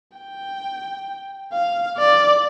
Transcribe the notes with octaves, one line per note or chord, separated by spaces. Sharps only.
G5
F5
D5